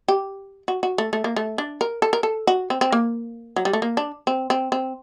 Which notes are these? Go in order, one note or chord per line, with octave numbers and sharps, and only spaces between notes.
G4
F#4
F#4
A3
A3
A#3
A3
D4
A#4
A4
A#4
A4
F#4
C4
C4
A#3
F#3
G3
A3
A#3
D4
C4
C4
C4